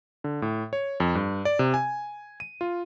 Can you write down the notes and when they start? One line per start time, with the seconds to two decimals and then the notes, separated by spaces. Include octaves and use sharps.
0.24 D3
0.42 A2
0.73 C#5
1.00 F2
1.15 G2
1.45 D5
1.59 C3
1.74 G#5
2.40 D#7
2.61 F4